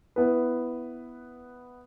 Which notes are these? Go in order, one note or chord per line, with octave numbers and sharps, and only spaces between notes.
B3 E4 B4